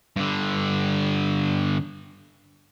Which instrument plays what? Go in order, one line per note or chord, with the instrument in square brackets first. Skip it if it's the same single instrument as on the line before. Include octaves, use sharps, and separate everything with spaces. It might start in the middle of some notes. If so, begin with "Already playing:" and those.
[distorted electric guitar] G2 D3